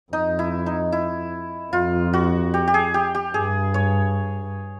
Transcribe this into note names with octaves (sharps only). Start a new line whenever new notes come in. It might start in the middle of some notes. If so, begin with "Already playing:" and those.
F2 D#4
E4
D#4
E4
F2 F4
F#4
G4
G4
G#4
G4
G4
G2 G#4
C#5